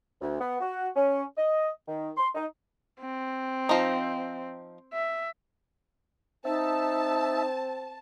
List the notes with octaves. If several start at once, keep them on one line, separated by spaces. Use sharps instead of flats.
D2
B3
F#4
C#4
D#5
D#3
C6
D#4
C4
F3 D#4
E5
C4 D#4 E5 A5